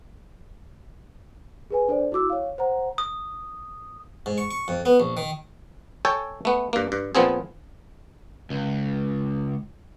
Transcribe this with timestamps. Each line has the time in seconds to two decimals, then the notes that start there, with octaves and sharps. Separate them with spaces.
1.70 G#4 B4 G#5
1.88 D4 A4 C5 D5
2.12 E4 F#4 D6 E6
2.30 C#5 F5
2.58 C5 F#5 A#5
2.98 D#6
4.26 G#2
4.38 C#6
4.51 C#6
4.68 F2
4.86 B3
5.00 A#1
5.17 D#3
6.05 A4 C#5 G5 G#5
6.45 A3 B3
6.73 G2 A#3
6.92 G2
7.15 A#2 F3 B3 C4 G#4
8.50 C#2